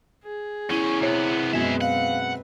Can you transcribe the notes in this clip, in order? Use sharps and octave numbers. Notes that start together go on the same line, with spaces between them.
G#4
E2 C#4 E4
C3 B3 C#5
F#2 B2 G#3 C4 G#4 B4 E5
F5 F#5